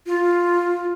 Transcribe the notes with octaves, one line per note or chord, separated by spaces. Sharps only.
F4